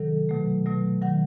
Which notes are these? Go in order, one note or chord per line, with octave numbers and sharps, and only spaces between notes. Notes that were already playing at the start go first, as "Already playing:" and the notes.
Already playing: C3 D#3 F#3 A4
B2 F#3 A3
B2 F#3 A3
D#3 F#3 F#5